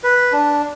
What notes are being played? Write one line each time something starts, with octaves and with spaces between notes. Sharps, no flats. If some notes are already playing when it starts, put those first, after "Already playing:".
B4
D4